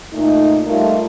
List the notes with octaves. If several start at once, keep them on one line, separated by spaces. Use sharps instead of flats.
A#2 A3 D#4
G3 A3 D#4 F4 A#4